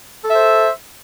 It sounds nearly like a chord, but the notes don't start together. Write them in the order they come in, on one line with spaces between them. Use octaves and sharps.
A4 E5 C5